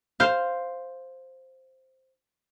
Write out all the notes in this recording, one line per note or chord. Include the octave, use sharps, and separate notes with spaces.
C5 F5